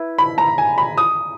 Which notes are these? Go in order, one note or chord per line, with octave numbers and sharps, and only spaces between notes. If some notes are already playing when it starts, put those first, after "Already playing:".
Already playing: E4 B4
B5
A#5
G#5
B5
D#6